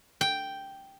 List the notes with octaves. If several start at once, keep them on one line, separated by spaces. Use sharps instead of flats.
G5